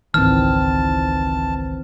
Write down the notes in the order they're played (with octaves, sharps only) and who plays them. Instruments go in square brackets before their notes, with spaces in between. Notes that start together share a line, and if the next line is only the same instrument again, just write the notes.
[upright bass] G#1 C#2 [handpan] D#3 E3 C4 [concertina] A5 [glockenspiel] F6